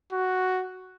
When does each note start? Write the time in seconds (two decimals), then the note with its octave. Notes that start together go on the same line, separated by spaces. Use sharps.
0.12 F#4